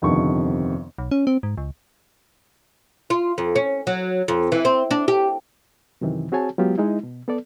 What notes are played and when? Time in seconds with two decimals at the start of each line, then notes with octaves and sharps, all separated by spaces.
0.02 G1 F2 C3 D#3 B3 C#6
0.98 B1
1.11 C#4
1.27 C4
1.43 G#2
1.58 C#2
3.10 F4
3.38 F2
3.56 C#4
3.87 F#3
4.28 F2
4.52 E3
4.65 C4
4.91 D4
5.08 G4
6.01 F#2 C3 D#3 E3
6.32 C4 F#4 G#4 C#5 G#5 A5
6.58 F#3 G#3 B3 F4 G4
6.78 G#3 D#4 E4
7.03 B2
7.28 B3 A4 D5